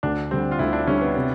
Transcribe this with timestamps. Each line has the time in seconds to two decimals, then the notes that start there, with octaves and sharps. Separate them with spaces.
0.03 D2 D4
0.31 D3 G3 C4
0.52 F4
0.59 D2 E4
0.73 D4
0.87 D3 G3 C#4
1.01 B3
1.15 C3